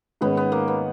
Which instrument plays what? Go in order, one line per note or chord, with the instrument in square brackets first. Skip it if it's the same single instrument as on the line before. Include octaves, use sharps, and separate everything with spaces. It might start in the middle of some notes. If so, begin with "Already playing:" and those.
[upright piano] G#2 D#3 G#3 C#4 [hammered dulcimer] B3
[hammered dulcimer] B3
A#3
B3